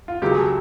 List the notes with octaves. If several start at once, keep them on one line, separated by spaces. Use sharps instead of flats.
F4
C#2 C#3 F#3 G4
G#4
A4